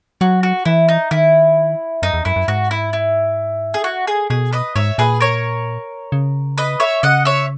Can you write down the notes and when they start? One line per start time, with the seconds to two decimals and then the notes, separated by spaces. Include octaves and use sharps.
0.21 F#3 F#4
0.43 F#4
0.65 E3 E4
0.89 D#4
1.11 D#3 E4
2.02 F#2 D#4
2.14 E2
2.25 F#2 E4
2.36 F#2
2.48 G#2 F#4
2.71 E4
2.93 E4
3.74 G#4
3.84 F#4
4.07 G#4
4.30 B2 G#4
4.53 B4 D#5
4.76 G#2 C#5 E5
4.98 A#2 G#4 B4
5.21 A#4 C#5
6.12 C#3
6.58 B4 D#5
6.80 C#5 E5
7.03 C#3 D#5 F#5
7.25 C#5 E5